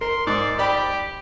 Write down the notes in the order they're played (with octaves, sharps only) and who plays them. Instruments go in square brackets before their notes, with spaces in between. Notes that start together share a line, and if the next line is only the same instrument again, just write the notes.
[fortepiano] A#4 [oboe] C6
[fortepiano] G#2 [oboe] D5
[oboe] G4 [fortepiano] D5 G5 B5